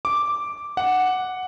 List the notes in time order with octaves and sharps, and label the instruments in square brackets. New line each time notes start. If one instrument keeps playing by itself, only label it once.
[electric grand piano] D6
F#5